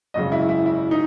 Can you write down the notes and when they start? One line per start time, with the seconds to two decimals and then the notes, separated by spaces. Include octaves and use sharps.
0.14 G#1 F#2 C#3 D#5
0.32 E4
0.49 E4
0.66 E4
0.91 D#4